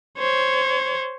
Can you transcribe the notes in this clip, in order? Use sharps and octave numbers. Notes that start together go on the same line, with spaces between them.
C5 C#5